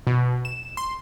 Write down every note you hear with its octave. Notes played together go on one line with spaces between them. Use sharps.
B2
E7
C6